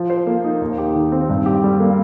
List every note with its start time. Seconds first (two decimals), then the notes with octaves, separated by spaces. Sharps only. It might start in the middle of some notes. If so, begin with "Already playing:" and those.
Already playing: F3
0.10 C5
0.27 A#3
0.44 D#4
0.62 D#2
0.78 G4
0.96 D#3
1.12 C4
1.29 G2
1.46 G4
1.64 G3
1.80 A#3